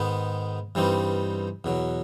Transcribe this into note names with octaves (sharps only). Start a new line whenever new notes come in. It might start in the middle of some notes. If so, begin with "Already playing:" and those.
Already playing: G#2 D#3 G#3 B3 D#4
G2 E3 G3 C4 D#4
E2 B2 F#3